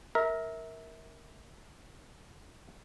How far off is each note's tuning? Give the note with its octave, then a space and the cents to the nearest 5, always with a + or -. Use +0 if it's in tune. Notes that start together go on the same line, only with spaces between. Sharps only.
A#4 +0 E5 -25